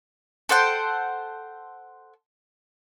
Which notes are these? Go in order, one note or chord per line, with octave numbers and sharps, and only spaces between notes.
A4 C5 F#5 G5